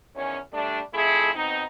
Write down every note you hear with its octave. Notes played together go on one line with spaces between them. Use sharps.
E2 D#3 C#4
G3 A3 D4
F2 A3 E4 G#4
B2 C4 D#4